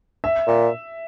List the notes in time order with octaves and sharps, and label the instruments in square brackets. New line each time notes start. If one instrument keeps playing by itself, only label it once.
[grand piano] E5
[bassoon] A#2